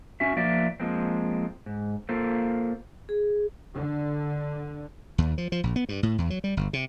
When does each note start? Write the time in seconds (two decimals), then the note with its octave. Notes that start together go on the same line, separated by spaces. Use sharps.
0.20 C#4 F#4 E5
0.36 F3 A#3 D5 E5
0.80 F3 G#3 A#3 C4
1.66 G#2
2.09 A#3 F4 A4 C5
3.09 G#4
3.74 D3
5.18 D#2
5.38 F3
5.52 F3
5.64 A#1
5.76 B3
5.89 G2
6.03 A2
6.18 E2
6.30 F#3
6.44 G3
6.57 G1
6.73 C3